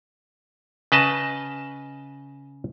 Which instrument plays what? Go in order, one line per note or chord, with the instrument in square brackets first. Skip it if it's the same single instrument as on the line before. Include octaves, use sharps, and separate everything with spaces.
[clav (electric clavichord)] C#3 B4 D#5 A5